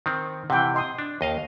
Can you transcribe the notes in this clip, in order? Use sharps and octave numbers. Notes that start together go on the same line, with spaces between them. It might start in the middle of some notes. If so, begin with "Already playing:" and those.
D#3 C4
C3 E3 F#5 G5
D#5 C6 D#6
D4
D#2 D#5 F5